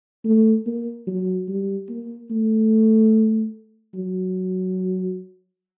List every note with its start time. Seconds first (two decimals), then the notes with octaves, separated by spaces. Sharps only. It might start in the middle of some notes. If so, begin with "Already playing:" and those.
0.25 A3
0.67 A#3
1.07 F#3
1.48 G3
1.89 A#3
2.31 A3
3.95 F#3